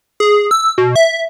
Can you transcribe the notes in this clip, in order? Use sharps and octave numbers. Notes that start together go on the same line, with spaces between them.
G#4
E6
B2
E5